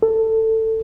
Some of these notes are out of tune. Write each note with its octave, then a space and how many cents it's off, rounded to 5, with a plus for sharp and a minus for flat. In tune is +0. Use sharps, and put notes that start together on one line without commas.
A4 +15